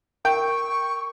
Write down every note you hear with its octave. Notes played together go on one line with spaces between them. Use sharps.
A#4 G5 C#6